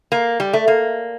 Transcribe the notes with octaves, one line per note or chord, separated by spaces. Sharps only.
A#3
G3
A3
A#3